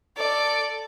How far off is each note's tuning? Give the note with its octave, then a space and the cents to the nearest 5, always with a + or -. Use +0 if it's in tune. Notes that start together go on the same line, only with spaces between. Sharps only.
A4 +10 D5 +0